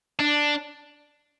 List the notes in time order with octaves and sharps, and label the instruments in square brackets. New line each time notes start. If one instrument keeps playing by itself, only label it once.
[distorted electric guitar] D4